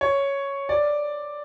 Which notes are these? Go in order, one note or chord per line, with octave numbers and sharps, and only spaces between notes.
C#5
D5